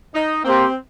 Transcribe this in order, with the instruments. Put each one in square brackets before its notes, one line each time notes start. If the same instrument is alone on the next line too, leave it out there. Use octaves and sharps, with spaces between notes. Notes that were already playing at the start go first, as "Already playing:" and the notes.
[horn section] D#4
[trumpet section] A#3 G4 C5 [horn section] C4